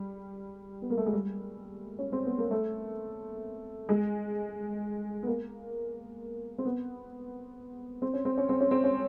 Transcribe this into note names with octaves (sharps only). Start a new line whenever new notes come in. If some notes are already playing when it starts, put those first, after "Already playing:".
Already playing: G3
B3
A#3
A3
G#3
G3
C#4
C4
B3
A#3
A3
G#3
B3
A#3
C4
B3
C4
C#4
C4
C#4
C4
C#4
C4
C#4